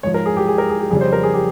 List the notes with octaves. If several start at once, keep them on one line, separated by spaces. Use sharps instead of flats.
G#2 F3 C#5
A#4
G#4
G4
G#4
A#4
G#4
G4
F2 C#3 G3 G#4
C5
A#4
G#4
G4